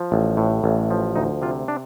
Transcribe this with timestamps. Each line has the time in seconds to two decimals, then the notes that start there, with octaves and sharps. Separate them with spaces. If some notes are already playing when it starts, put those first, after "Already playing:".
Already playing: F3
0.12 A1
0.37 A2
0.64 A1
0.91 F3
1.16 D2 D#4
1.42 C3 F4
1.68 D4